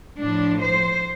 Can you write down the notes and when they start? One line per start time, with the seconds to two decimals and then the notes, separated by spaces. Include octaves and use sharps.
0.20 A2 F3 D4
0.62 C5